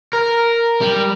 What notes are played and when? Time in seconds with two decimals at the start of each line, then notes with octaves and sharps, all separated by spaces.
0.13 A#4
0.82 G3